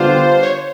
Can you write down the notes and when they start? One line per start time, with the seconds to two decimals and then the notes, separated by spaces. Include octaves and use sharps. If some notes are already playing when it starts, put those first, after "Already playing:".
Already playing: D3 G3 B3 D4 F4 C5
0.43 C#5